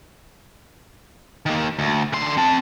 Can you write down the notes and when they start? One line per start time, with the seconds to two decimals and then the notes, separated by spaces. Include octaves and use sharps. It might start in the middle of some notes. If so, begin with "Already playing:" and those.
1.46 D#3 A#3
1.79 D2
2.13 D3 C6
2.37 C4 A5